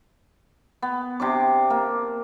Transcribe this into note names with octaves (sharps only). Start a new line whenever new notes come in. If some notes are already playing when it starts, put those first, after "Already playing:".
B3
C3 D4 D6
A#3